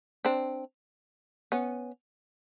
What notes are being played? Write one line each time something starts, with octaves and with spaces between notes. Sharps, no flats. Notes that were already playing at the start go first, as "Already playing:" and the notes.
C4 D4
B3 C#4